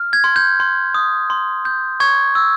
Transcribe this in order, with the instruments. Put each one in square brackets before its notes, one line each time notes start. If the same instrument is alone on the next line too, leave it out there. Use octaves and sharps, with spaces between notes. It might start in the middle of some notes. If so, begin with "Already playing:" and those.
Already playing: [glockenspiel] F6
G#6
C6
G6
C6
D#6
C6
G6
C#6 G#6
E6